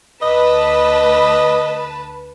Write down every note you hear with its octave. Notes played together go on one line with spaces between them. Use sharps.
D2 B4 D#5 A5